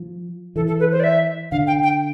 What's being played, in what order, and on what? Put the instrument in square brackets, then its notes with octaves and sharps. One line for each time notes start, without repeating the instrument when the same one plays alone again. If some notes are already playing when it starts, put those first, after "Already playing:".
Already playing: [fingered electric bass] F3
[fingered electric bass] E3 [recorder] A4
[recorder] A4
B4
C5
D5
E5
[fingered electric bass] D3 [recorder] F5
[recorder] G5
G5